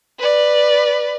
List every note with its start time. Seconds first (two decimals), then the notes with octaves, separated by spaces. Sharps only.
0.19 B4 D5